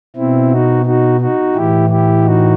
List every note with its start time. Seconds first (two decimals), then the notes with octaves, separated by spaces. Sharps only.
0.16 B2 C4 E4
0.51 D#4 F#4
0.85 D#4 F#4
1.20 D#4 F#4
1.55 A2 E3 E4 G4
1.90 E4 G4
2.24 D#4 F#4